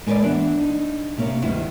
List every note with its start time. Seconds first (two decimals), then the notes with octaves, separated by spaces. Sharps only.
0.06 G#3 A#4 B4 C#5 D5
0.22 E3 B3 D4
0.61 D#4
1.17 C3 A#3 C4 C#4
1.42 D2 G2 D#3 E4